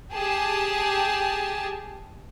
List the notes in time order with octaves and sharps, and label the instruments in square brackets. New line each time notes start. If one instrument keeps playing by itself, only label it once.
[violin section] G4 G#4 A5